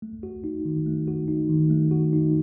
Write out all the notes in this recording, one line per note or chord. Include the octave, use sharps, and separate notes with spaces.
A3
F#4
D#4
D#3
A3
F#4
D#4
D#3
A3
F#4
D#4